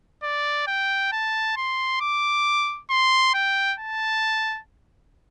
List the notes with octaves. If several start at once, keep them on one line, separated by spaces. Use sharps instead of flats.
D5
G5
A5
C6
D6
C6
G5
A5